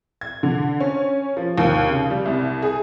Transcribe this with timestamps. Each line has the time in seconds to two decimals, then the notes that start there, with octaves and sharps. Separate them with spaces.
0.21 G#6
0.43 D3
0.80 C#4
1.37 F3
1.58 D#2
1.89 C#3
2.10 G3
2.26 C2
2.62 G#4